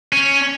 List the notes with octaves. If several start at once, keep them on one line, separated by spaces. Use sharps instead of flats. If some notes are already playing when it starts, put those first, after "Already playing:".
C#4